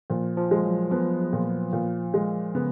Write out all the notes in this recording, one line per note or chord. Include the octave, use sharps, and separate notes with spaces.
A#2 F3
F3
G#3
F#3
F3 B3
A#2
A#2
G#3
C#3 B3